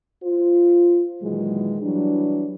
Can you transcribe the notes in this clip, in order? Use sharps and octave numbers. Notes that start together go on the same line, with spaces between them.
F4 C5
A#2 D#3 E3 F#3 G#3
E3 F#3 G3 D4